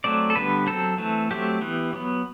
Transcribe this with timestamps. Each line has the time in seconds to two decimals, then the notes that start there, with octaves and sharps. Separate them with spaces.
0.04 F#3 A3 C4 D5
0.30 A4
0.36 D3 G3 B3 B4
0.67 F#3 C4 A4
0.98 E3 A3 C4
1.31 F#3 A3 C4 G4
1.61 E3 B3
1.93 F#3 B3